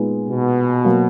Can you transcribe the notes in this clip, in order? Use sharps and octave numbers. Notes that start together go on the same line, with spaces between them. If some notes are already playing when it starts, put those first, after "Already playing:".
Already playing: A#2 G#3 B3 D#4
B2
F#3 A#3